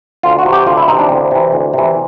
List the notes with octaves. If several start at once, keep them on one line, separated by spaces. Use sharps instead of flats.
D2 F4
F#4
C3 E3
G4
D2 F4
E4
C3 E3 D#4
D4
D2 C4
C3 E3
D2
C3 E3